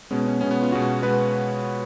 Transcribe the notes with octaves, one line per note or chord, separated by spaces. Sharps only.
B2 G#3 B3 C#4
C#4
B2 G#3 B3 C#4
B3
F4
B2 G#3 B3 F#4
B2 G#3 B3 B4